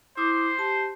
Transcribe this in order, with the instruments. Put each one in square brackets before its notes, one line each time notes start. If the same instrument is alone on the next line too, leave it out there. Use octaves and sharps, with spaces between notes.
[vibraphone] E4 D6 D#6 [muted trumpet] C5
[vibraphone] G4 A5